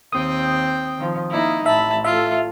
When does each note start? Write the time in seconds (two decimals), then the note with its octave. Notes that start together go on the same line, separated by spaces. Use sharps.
0.12 D#2 C4 G5 D#6
0.98 D#3 F3
1.30 A#3 D#4 E4
1.66 A1 E5 A5 B5
2.04 F4 A4 E5